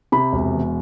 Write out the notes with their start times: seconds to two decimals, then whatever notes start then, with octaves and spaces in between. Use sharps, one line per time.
0.12 C3 B5
0.33 E1
0.54 E2